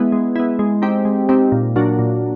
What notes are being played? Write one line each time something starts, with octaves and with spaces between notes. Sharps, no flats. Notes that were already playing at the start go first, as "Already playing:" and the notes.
Already playing: G#3 B3 E4
G#3
B3 E4
G#3
C4 D#4 G4
G#3
C4 D#4 G4
A#2
F#3 A#3 D4 F#4
A#2